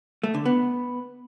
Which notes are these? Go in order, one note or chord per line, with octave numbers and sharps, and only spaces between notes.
A3
D3
B3